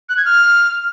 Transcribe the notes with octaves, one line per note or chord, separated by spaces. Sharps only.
F#6
G#6
F6